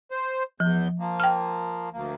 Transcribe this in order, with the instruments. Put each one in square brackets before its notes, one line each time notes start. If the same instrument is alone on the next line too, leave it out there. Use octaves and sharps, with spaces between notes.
[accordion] C5
[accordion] E2 G6 [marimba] F3
[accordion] F3 A#3
[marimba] G5 F6
[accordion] D2 A#3